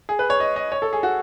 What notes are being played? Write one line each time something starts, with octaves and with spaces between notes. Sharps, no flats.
G#4
B4
C#5
D#5
D#5
C#5
A4
G#4
F#4